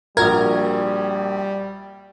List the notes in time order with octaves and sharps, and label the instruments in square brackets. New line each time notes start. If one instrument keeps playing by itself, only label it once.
[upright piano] A#1 F#4 G#6 [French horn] G3 [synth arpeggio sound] A#4